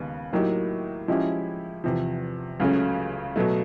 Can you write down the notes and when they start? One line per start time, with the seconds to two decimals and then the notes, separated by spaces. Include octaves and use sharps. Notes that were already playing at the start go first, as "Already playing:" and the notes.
Already playing: D#2 C#3 G#3 B3
0.32 A2 F#3 A#3 D#4 G4
1.08 F3 G#3 C#4 E4 G4
1.84 E2 C3 F3
2.60 C#2 C#3 F#3 A3 C#4
3.36 B2 F#3 A3